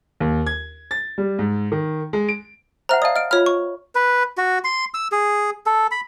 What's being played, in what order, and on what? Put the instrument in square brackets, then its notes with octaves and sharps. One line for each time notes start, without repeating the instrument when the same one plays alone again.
[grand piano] D#2
G#6
A6
G3
G#2
D#3
G#3
D7
[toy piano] C5 E5 F#5 [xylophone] A#5 F6
[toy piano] D5 D#5 A5 [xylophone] F5 D#6
[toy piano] D#5 [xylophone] F6 D7
[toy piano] F4 B5 [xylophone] C#5 F6
[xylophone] C#6
[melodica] B4
F#4
C6
E6
G#4
A4
B5